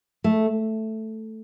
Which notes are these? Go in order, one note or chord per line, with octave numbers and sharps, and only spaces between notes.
A3